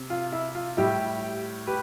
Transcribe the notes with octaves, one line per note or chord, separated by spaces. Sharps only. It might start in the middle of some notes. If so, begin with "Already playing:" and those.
Already playing: C3
F4
E4
F4
A2 G3 E4 G4
G4 B4